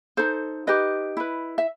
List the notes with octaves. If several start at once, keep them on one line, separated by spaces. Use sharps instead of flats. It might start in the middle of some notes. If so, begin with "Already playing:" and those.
D#4 A4 C5
D#4 G4 B4 D#5
E4 B4
E5